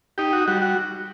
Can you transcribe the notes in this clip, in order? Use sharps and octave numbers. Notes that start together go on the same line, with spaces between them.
D#4 G4
F#4
G3 F#4
F#4